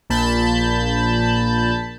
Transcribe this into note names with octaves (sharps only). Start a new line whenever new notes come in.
A#1 A#2 A5 B5 G6